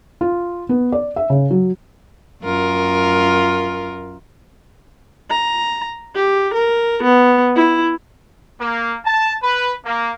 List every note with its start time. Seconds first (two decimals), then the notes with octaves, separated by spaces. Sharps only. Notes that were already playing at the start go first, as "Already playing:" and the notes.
0.21 F4
0.69 B3
0.92 D5
1.16 E5
1.30 C#3
1.50 F#3
2.44 F#2 F4 A#4
5.30 A#5
6.15 G4
6.54 A#4
7.03 B3
7.56 E4
8.61 A#3
9.05 A5
9.43 B4
9.85 A#3